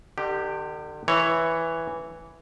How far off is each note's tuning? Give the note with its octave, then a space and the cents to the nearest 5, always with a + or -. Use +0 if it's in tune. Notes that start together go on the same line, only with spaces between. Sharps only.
D3 +45 G4 +0
E3 +0 C#5 +0